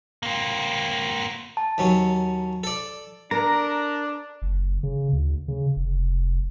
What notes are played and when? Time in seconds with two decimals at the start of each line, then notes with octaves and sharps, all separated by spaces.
0.23 A#3 C4
1.57 A5
1.78 D#2 F#3 C#4
2.64 A4 D5
3.31 D4 A#4 A#5
4.42 F#1
4.83 C#3
5.13 D2
5.48 C#3
5.76 F1